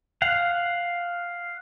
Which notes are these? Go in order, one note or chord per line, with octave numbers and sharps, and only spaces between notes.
F5 F#5